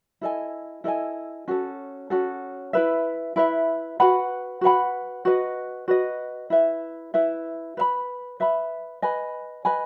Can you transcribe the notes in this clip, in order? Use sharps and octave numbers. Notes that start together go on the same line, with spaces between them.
E4 A4 D#5 G#5
E4 A4 D#5 G#5
C#4 F#4 A4
C#4 F#4 A4
E4 B4 E5
E4 B4 E5
F#4 B4 F#5 B5
F#4 B4 F#5 B5
F#4 B4 D#5
F#4 B4 D#5
E4 B4 E5
E4 B4 E5
B4 E5 B5
B4 E5 B5
B4 D#5 G#5 B5
B4 D#5 G#5 B5